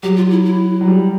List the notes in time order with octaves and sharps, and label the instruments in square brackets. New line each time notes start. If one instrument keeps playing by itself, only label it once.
[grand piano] F#3 [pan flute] G4
[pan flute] F4
E4
E4
[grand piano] F#3
G3